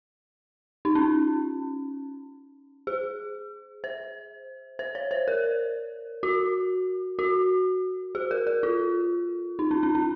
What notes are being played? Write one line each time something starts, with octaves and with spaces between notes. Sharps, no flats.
D#4
C#4
G#4
C5
C5
C#5
C5
A#4
F#4
F#4
G#4
A#4
A#4
F4
D#4
C#4
C#4
C#4